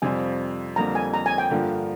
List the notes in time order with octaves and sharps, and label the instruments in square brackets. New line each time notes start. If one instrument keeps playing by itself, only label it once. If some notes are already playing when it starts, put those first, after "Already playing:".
[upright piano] F2 C3 G3 C4 F4 [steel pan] G#5
[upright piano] F2 D3 G3 A#3 F4 [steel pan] A#5
[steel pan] G#5
A#5
G#5
G5
[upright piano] G2 D3 F3 A#3